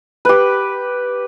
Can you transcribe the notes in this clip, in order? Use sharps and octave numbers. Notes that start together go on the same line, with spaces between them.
G4 B4